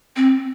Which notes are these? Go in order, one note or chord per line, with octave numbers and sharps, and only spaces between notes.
C4